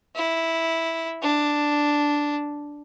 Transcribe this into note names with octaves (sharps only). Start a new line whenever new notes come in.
E4
D4